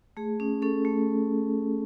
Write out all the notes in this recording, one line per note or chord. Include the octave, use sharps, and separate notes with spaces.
A3 G#4
C#4
C#4 A4
A3